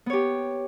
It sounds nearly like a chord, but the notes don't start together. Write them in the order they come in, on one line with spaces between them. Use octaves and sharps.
B3 C#5 G4